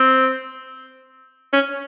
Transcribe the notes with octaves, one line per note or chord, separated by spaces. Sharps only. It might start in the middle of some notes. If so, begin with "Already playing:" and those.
Already playing: C4
C#4